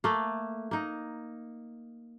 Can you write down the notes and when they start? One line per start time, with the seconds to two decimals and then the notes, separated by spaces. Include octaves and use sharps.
0.04 A3 A#3
0.71 A#3 D#4